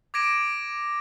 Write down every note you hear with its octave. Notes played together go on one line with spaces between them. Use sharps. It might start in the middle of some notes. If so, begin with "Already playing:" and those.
D6 G#6 A#6 D7 E7